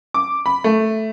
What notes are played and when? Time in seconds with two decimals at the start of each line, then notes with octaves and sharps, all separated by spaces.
0.14 D6
0.46 B5
0.64 A3